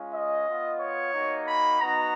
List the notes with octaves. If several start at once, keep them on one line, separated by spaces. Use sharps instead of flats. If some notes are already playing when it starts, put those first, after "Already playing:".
Already playing: G#3 C#4 F4
D#5
B3 F4
C#5
A#3 D#4 F#4
B5
B3 D#4 F#4 A#5